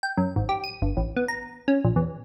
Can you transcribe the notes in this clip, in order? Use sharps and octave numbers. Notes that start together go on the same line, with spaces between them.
G5
F#2
G#1
G4
D#7
G1
A1
B3
A#5
C#4
A#1
E2